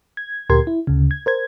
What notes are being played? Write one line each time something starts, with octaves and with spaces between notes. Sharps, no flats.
G#6
D2 A#2 G4 A#4 C6 G#6
E4
D2 C#3
G#6
A#4 C5 G#6